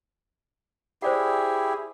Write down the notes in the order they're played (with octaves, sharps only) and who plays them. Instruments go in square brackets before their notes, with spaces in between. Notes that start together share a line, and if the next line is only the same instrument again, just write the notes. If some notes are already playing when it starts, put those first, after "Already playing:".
[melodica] E4 G4 G#4 [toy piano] C5 D5 F#5